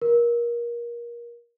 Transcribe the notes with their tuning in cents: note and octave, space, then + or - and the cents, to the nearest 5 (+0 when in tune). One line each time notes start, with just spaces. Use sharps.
A#4 +25